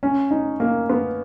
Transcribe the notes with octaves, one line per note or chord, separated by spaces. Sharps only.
C#4
D#4
A#3
B3